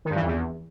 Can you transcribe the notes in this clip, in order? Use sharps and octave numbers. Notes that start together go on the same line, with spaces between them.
D#3
G2
E3
F2
E2